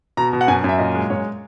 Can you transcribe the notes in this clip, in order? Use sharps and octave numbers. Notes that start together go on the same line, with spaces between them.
B2 A#5
B2
F#5
F#2 G#5
F#2 E5
A#2 D#5
G#3
F#2 C#5